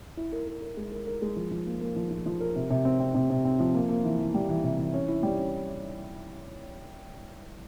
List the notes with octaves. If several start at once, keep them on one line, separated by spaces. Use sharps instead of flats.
E4
A#4
A#4
A#4
G#3
A#4
A#4
G#3
F3
F3
A#3
A#3
F3
F3
F3
A#4
C3
C3
C4
C4
C3
C3
C4
F3
A#3
A#3
E3
E3
G3
E3
C3
E3
C#4
E4
G3
C#4